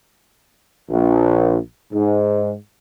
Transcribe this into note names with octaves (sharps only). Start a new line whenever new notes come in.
A#1
G#2